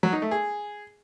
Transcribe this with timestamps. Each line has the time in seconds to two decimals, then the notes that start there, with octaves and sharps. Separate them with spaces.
0.03 F#3
0.13 D#4
0.22 A3
0.31 G#4